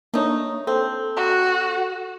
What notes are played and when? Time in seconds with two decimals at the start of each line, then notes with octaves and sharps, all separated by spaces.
0.14 A3 A#3 D4 D#4 C#5
0.67 C4 A4
1.16 F#4